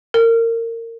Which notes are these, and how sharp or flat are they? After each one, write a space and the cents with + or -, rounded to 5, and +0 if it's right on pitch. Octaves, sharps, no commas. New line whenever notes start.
A#4 -25